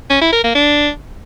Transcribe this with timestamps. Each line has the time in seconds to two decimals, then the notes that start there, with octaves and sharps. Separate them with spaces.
0.10 C#4
0.21 E4
0.33 A#4
0.44 A#3
0.55 D4